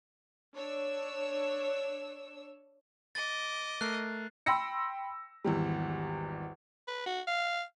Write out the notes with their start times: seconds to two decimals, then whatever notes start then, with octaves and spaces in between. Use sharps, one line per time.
0.54 D4 C#5 E6
3.15 D#5 D6 A6
3.81 A3 A#4 F#6 C7
4.46 G5 B5 C6 E6 A#6 C#7
5.44 G#1 E2 G3
6.88 B4
7.06 F#4
7.27 F5